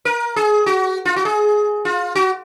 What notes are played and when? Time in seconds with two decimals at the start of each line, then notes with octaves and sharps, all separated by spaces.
0.05 A#4
0.36 G#4
0.66 F#4
1.05 F4
1.16 F#4
1.25 G#4
1.85 F4
2.15 F#4